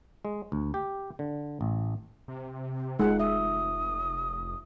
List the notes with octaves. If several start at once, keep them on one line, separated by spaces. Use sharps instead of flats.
G#3
D2
G4
D3
A1
C3
F1 G#3 D#4 F4 F#5
E5 D#6